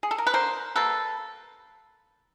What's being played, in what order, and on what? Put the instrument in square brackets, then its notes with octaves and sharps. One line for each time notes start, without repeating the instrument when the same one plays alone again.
[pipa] G#4
A4
A#4
B4
D3 A#4 C5
G3 A#3 A4 B4